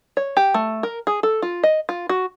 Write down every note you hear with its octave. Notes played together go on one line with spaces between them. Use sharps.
C#5
G4
A3
A#4
G#4
A4
F4
D#5
F4
F#4